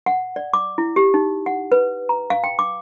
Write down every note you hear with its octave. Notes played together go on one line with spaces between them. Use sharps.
F#5
D5
D6
E4
G4
D#4
F#5
B4
A#5
F5
G5
D6